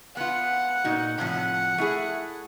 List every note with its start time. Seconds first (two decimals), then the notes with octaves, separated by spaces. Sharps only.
0.17 B3 F4 F#5
0.84 A#2 D#4 F#4
1.18 A2 C3 F3 F#5
1.78 A3 E4 G#4